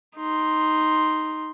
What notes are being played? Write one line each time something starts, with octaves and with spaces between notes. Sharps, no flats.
D#4 C6